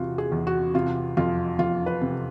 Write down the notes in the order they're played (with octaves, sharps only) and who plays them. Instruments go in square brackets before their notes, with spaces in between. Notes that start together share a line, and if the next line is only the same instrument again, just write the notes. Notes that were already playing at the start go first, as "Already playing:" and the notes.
Already playing: [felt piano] E2 C3 F4 F#4
G#4
E2
F#4
C3 F4
F2 F4
F2 F4
B4
C3